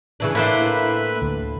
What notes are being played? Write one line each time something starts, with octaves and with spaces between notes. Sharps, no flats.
C#3 E3 D4
A2 A#3 D4 E4 B4 C5 E5 B5
D2